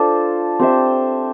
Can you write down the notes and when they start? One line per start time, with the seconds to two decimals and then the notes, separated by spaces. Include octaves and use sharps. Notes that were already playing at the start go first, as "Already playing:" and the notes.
Already playing: D4 F4 A4 C5
0.59 C4 G4 C5 E5